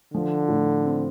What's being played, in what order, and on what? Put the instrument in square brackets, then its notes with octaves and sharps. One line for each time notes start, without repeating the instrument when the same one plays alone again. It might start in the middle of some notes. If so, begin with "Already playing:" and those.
[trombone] D3 [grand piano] F3
[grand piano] A2
C4